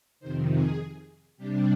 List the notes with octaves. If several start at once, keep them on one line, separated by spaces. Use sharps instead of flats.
F2 C3 D#3 C5
G#4
C3 G3 D4 G4